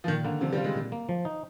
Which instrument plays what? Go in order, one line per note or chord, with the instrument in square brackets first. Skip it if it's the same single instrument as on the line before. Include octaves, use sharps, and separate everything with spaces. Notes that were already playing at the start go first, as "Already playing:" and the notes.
[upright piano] F3
[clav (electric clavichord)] A#2 [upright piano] D#3
[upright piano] D3 [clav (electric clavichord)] A#3
[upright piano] C3 [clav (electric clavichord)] F3
[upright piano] G3
[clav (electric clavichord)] F4
[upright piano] G#3
[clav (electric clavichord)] A#2
A#3
F3
D#4